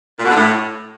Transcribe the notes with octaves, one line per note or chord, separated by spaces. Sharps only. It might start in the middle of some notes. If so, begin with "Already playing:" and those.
A#2
B2
D3
A2